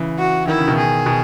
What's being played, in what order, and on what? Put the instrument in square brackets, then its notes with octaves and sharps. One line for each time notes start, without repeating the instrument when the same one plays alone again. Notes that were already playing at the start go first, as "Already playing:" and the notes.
Already playing: [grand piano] C#3 E3
[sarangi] F#4
[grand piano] D#3 [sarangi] E4
[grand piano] C#3
B2 D#3
[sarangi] G#4
[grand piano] B2